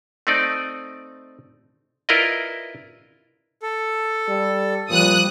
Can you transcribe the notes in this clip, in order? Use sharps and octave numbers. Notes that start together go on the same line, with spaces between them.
A3 C4 D#4 D5
E4 F4 A#4 B4 D5 D#5
A4
G3
A#2 F3 G3 D#6 F#6